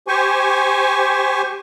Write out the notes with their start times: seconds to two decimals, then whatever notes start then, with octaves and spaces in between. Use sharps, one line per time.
0.08 G4 C5 G#5 C#6